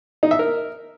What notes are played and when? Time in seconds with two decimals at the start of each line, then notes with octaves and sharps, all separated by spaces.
0.23 D#4
0.31 E5
0.39 A#4